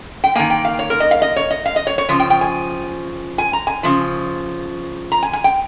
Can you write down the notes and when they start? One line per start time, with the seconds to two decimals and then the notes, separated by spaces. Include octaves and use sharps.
0.24 G5
0.35 D#3 A#3 G#5
0.50 G5
0.65 F5
0.79 C#5
0.90 A#4
1.00 D#5
1.11 F5
1.22 D#5
1.36 C#5
1.51 D#5
1.66 F5
1.76 D#5
1.87 C#5
1.98 C#5
2.09 C#3 F3
2.20 G5
2.30 G5
2.41 G#5
3.38 G#5
3.53 A#5
3.67 G#5
3.83 C#3 F3
5.12 A#5
5.23 G#5
5.33 G#5
5.44 G5